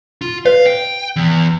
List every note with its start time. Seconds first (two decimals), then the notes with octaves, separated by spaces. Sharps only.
0.21 F4
0.45 B4 F5
0.66 G5
1.16 E2